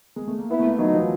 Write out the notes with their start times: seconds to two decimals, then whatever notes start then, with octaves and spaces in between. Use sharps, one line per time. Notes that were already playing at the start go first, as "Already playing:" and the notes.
0.16 G#3
0.27 A3
0.39 A#3
0.51 B3 E4
0.59 A3
0.65 A#3
0.79 F#3 D#4
0.94 F3
1.00 E3